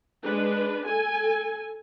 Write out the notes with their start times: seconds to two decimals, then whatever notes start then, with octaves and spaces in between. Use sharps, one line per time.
0.23 G#3 D4 B4
0.87 A4 G#5